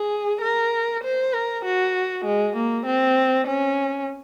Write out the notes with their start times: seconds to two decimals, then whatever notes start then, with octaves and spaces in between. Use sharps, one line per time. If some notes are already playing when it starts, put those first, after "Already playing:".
Already playing: G#4
0.42 A#4
1.04 C5
1.34 A#4
1.65 F#4
2.25 G#3
2.56 A#3
2.86 C4
3.47 C#4